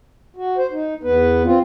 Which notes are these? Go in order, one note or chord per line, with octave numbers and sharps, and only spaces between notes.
F#4
C5
D#4
E2 B3 B4
C4 F4